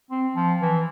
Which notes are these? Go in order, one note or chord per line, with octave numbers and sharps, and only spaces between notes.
C4
F3
E3